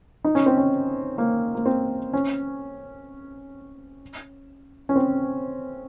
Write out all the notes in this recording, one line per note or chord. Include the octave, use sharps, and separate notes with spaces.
D#4
C#4
C4
C#4
A#3
A#3
C4
C#4
C#4
C4